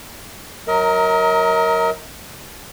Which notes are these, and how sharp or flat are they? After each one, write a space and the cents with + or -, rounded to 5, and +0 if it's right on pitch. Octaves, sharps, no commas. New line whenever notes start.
F#3 +0 A#4 +0 D#5 +40